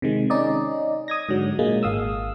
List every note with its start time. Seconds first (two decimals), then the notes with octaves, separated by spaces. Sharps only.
0.02 C3 D#3 G#3
0.30 C#4 D#4 D5 D#5
1.08 D#6 G#6 A#6
1.29 G#2 D3 F#3
1.59 A#2 G#3 A#3
1.83 G#1 F5 D#6 E6